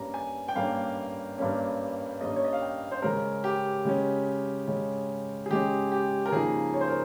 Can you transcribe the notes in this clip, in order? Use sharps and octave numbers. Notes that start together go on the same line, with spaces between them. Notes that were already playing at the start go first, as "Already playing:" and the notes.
Already playing: G2 G3 A#3 C#4 A#5
G#5
G5
G2 G3 A#3 C#4 F5
G2 G3 A#3 C#4
G2 G3 A#3 C#4 D#5
C#5
D#5
F5
G5
C5
C#3 G#3 C#4 A#4
G4
C#3 G#3 C#4
C#3 G#3 C#4
G#4
C#3 G#3 C#4 G4
G4
A#4
C#3 F3 A#3 D#4 G#4
C#5
C5
A#4